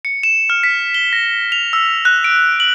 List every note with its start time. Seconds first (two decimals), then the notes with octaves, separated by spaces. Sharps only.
0.05 C#7
0.23 E7
0.50 F6
0.63 B6
0.94 G7
1.13 A#6
1.52 F7
1.73 E6
2.05 F#6
2.24 D7
2.60 F#7